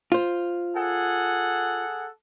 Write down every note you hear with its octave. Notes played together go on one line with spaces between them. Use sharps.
F4 C5
G#4 A4 F#5